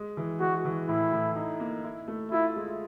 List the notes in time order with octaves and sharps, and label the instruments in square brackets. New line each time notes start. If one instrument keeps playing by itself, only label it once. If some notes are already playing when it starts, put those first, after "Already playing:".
Already playing: [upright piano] G#3
E3
[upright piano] G#3 [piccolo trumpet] F#4
[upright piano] E3
[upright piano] A2 [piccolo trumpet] E4
[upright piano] A2
D#4
A#3
E4
A3
[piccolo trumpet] E4 [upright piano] F4
[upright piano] G#3